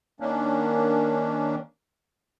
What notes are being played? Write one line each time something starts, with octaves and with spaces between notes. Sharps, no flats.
D#3 A#3 C#4 D4